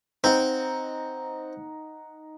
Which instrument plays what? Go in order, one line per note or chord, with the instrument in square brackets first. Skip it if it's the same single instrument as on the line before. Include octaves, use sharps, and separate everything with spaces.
[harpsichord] C4 [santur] D#4 F#5